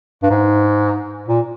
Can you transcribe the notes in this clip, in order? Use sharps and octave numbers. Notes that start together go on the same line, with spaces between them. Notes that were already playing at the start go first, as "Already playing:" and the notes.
G2
G#2
A#2